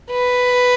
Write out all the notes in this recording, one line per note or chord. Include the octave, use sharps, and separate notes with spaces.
B4